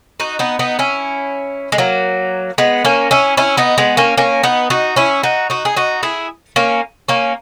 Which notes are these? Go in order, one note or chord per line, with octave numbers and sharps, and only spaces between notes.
D#4 F#4
B3 D#4
B3 D#4
C#4 E4
G#3
F#3 A#3
G#3 B3
A#3 C#4
C#4 E4
C#4 E4
B3 D#4
G#3 B3
A#3 C#4
A#3 C#4
B3 D#4
D#4 F#4
C#4 E4
D#4 F#4
D#4 F#4
G#4
D#4 F#4
E4 G#4
A#3 C#4
A#3 C#4